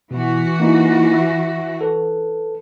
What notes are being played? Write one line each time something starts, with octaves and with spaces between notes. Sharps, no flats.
B2 E3 F#4
A#3 D#4 E4
E5
A4 B4